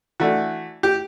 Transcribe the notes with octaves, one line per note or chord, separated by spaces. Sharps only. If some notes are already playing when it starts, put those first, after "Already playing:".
E3 A3 D4 F#4
G4